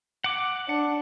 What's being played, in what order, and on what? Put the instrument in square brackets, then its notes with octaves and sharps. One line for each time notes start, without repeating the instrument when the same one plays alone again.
[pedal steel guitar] F#5 D6
[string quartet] D4 [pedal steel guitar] F#5